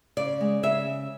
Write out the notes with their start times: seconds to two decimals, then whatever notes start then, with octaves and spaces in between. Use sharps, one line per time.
0.17 C#3 D5
0.41 G#3
0.63 C#3 E5